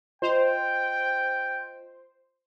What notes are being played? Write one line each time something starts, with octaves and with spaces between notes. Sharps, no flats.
F4 C5 D#5 G5 F7